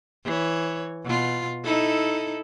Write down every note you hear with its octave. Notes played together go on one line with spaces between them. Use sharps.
E3 C#5
B2 F4
D#4 E4 A4